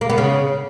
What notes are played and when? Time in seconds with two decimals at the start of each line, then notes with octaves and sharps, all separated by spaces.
0.01 A#3
0.09 B3
0.18 C#3